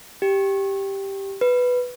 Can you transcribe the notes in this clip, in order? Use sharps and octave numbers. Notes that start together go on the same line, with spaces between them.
G4
B4